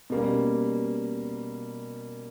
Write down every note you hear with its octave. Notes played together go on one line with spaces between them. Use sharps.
B2 G3 A#3 C#4